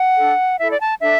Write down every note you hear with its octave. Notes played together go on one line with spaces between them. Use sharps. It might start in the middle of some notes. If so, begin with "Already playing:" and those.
Already playing: F#5
D4 A4
E4 A4 E5
D5
A5
D4 A4 E5